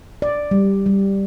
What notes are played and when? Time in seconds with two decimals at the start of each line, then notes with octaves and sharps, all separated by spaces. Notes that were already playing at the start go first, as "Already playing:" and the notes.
0.22 D5
0.51 G3
0.86 G3